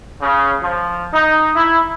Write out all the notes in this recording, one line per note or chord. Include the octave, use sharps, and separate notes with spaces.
C#3
F3
D#4
E4